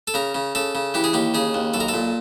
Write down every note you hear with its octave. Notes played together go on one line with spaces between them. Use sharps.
A4
C#3 A#4
C#3
C#3 A4
C#3
E3 G4
G#4
D#2 G4
C#3 G#4
D#2
B1 A4
A#4
A4
A#2